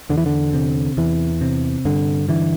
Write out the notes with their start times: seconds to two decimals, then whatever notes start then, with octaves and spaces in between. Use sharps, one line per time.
0.09 E2 D3
0.17 E3
0.26 D3
0.53 C3
0.97 E2 E3
1.41 C3
1.85 G2 D3
2.29 D3 E3